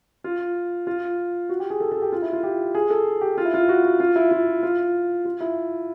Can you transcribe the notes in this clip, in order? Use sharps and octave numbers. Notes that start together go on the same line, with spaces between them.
F4
F4
F#4
G4
G#4
A4
A4
G4
F4
E4
F4
G4
G#4
A4
G4
F4
E4
F4
F#4
F#4
F4
E4
F4
F4
F4
E4